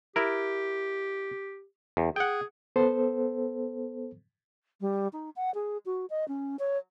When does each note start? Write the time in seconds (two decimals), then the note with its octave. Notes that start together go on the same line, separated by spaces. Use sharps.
0.16 E4 G4 A#4
1.97 E2
2.16 G#4 F#5 G5
2.76 B3 A4 C5
4.81 G3
5.13 D#4
5.36 F#5
5.54 G#4
5.85 F#4
6.10 D#5
6.28 C#4
6.59 C#5